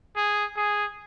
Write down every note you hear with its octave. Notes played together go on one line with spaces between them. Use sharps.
G#4
G#4